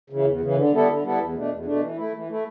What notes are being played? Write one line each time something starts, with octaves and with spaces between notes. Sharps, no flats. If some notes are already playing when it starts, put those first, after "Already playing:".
C#3 E3
E2
C#3 E3
D3
G3 B3 E4 A4
D3
G3 B3 E4 A4
E2
B2 A3 D4
E2
B2 A3 D4
E3
A3 E4
E3
A3 E4